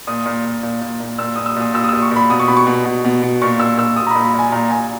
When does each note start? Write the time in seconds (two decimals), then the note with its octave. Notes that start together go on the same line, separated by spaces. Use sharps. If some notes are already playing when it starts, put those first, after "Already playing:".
0.07 A#2 D#6
0.26 A#2
0.45 A#2
0.63 A#2
0.81 A#2
1.00 A#2
1.19 A#2 E6
1.36 A#2 D#6
1.46 E6
1.56 A#2 D#6
1.74 A#2 E6
1.84 D#6
1.89 A#2 E6
2.02 C#6
2.11 A#2 B5
2.30 B2 D#6
2.40 C#6
2.48 B2 B5
2.57 C#6
2.67 B2
2.85 B2
3.05 B2
3.23 B2
3.42 A#2 C#6
3.60 A#2 E6
3.77 A#2 E6
3.96 A#2 D#6
4.07 A#5
4.11 B5
4.15 A#2
4.24 B5
4.34 A#2 G#5
4.52 A#2 A#5
4.71 A#2 G#5